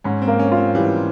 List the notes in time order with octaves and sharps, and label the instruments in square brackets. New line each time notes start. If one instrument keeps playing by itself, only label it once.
[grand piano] G#2 [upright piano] C#4
[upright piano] C4
[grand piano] A#3
[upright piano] C#4
[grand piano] F4
[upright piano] C4
[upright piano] E3 [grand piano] G3